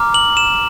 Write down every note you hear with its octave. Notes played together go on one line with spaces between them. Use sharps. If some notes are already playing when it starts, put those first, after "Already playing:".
Already playing: A#5 D6 F6
F#7
E7